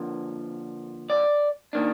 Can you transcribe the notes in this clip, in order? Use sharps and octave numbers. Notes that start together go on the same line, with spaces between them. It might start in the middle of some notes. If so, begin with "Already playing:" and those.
Already playing: D3 F3 A#3
D5
D#3 A#3 D4